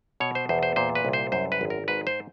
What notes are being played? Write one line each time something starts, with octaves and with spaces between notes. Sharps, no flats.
B2 C#5
C5
E2 C5
C5
A#2 C5
B4
C2
C5
F#2 C5
B4
G#1
A#4
G#2 B4
C5